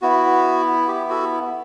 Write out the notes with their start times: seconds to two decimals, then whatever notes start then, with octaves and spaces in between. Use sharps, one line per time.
0.02 B3 E4 F#4
0.88 G4
1.09 F#4 A4